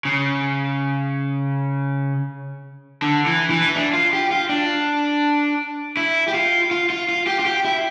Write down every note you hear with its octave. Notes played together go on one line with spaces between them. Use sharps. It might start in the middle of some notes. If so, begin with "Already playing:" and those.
C#3
D3
E3
E3
E4
D4
F4
G4
F4
D4
E4
G4
F4
F4
F4
F4
G4
F4
G4
E4